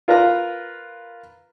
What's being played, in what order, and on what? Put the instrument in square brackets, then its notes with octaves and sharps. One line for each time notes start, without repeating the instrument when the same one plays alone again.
[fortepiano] F4 A#4 B4 A#5